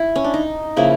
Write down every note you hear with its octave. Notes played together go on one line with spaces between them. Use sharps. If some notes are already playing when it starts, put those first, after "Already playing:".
Already playing: E4
C#4
D4
D#4
C#3 F3 A#3 E4